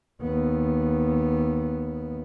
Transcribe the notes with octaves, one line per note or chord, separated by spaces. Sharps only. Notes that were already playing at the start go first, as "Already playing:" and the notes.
D#2 B3